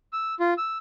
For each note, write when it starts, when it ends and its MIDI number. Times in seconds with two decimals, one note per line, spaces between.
0.13 0.35 88
0.40 0.54 65
0.58 0.78 88